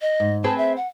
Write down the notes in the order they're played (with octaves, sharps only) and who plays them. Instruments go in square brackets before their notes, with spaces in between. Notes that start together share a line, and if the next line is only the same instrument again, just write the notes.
[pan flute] D#5
[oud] G#2
[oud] C4 G#4 B4 [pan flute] A5
[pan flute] E5
F#5